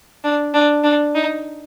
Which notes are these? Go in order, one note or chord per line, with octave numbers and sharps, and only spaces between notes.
D4
D4
D4
D#4